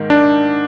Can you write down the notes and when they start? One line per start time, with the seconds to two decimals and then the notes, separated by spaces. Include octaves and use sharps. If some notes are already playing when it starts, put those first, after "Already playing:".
Already playing: G#2 D#3 A#3 D#4
0.10 D4